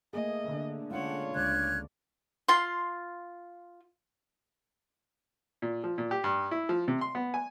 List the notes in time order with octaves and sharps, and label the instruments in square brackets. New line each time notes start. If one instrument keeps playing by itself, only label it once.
[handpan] A3 A#3 G#4 [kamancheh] D#5
[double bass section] D3
[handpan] G#3 C#4 D4 [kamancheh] F4 C#5 [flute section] F#5
[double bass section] C#2 [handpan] D3 D5 [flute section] F6 F#6 G#6
[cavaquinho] F4 C6
[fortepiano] A#2
F3
A#2
G4
G2
E4
F3
C3
C6
B3
G#5